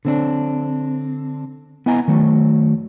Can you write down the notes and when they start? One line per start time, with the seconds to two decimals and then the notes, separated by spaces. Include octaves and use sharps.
0.05 D3 C4 D4
1.86 B3 E4 D#5 G#5 A#5
2.08 D#3 F#3 A3